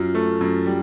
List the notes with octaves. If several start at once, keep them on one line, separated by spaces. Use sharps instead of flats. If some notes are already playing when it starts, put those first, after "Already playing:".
Already playing: F#2 F4
A3
F#2
G3